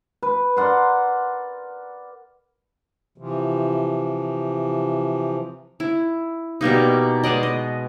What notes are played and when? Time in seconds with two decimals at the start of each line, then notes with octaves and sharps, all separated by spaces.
0.23 B4
0.57 A#4 D5 F#5 C6
3.18 C3 E3 F3
5.80 E4
6.61 B2 G3 A#3 D#4
7.24 G#3 B3 D5 D#5
7.43 D#5